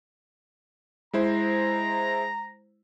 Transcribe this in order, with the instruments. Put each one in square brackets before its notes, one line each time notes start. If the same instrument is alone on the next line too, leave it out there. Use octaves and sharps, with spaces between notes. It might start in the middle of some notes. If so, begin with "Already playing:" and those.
[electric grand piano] G#3 E4 C5 [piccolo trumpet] A#5